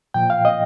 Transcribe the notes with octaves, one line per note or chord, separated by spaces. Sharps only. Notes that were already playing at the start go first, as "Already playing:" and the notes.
A#2 F3 G5
F5
D#5